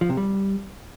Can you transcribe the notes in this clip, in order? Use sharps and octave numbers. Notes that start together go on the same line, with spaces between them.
F3
C3
G3